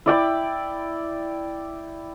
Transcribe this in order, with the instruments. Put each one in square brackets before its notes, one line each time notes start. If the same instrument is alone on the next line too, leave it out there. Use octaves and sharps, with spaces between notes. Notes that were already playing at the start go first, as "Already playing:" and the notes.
[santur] E4 D5 G5 D6